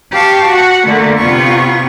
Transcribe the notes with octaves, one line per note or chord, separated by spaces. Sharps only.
G4 F5 A5 C#6
F#4 F#5
D3 A3 A#3
C3 B3 F4 C#6